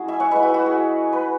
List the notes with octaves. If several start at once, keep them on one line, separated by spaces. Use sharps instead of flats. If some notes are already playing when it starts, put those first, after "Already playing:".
Already playing: F#3 C#4 E4 F#4 G#4
E5 G#5
C#5 F#5
G#3 E4 B4 E5
F#4 B4
F#4
G#4
B4